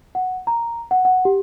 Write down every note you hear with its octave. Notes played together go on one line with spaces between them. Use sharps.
F#5
A#5
F#5
F#5
G4